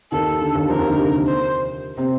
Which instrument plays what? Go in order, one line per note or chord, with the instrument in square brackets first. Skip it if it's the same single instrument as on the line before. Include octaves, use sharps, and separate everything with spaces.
[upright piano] D#2 D#3 [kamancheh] A4
[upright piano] D3
D#2 D#3
[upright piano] F2 F3 [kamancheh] A#4
[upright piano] D#2 D#3
D3
C3
[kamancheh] C5
[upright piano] C3 C4